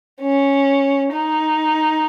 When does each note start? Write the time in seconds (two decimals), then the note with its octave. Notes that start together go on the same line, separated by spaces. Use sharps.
0.21 C#4
1.12 D#4